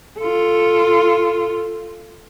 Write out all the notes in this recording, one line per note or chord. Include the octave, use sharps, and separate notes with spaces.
F4 A4